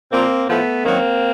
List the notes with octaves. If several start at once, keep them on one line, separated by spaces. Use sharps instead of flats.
A#2 F3 A#3 C4
A2 F3 A3 B3
F#2 D#3 F#3 A#3 C4